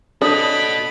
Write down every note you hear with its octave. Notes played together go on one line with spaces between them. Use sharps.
D4 F#4 A4 C#5 D#5 B5 D#6